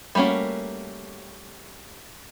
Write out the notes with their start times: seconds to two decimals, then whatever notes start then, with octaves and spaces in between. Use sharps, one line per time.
0.15 G3 A3 A#3 C#4 F#4